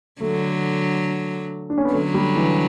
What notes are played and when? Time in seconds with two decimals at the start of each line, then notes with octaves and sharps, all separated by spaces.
0.20 D3 F#3 A3
1.70 D4
1.78 C#4
1.85 B3
1.93 D3 F#3 A3
2.14 G3
2.36 E3